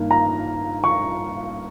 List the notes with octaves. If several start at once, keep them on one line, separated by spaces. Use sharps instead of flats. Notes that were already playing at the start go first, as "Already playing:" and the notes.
Already playing: G2 D#3 A#3
A#5
C#6